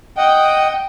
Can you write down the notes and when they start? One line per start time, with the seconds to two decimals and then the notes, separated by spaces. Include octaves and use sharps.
0.17 D#5 F#5 G5